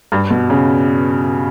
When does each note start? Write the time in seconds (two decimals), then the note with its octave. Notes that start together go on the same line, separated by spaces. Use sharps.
0.12 G2
0.30 B2
0.50 C#3